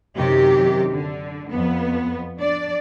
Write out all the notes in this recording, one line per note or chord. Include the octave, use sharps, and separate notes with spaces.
F#2 C3 D#3 G4
D3
F2 B3
D4 D5